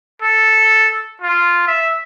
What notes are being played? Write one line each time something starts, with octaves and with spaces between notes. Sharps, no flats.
A4
F4
E5